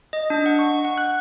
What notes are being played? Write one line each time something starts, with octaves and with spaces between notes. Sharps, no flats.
D#5
D4
F#5
C#6
F#5
F#6